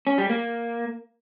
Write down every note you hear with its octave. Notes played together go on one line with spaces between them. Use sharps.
C#4
G3
A#3